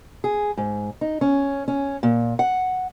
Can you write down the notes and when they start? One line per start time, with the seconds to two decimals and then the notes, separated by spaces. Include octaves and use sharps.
0.24 G#4
0.57 G#2
1.01 D#4
1.21 C#4
1.68 C#4
2.03 A#2
2.39 F#5